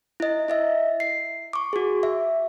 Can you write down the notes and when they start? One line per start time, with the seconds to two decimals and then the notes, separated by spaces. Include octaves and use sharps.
0.20 E4 D#5
0.48 E4 D#5 E5
1.00 C7
1.53 C#6 D6
1.73 F#4 G#4
2.03 E5